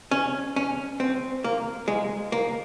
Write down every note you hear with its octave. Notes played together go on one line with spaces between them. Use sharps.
C#4
C#4
C4
A#3
G#3
A#3